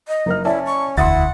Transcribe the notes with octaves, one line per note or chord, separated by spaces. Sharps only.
D#5
F#1 D#4 A#4 F6
C#4 E4 D5 E5 A5
C#6
E1 D2 E4 F#5 C6 D#6 A6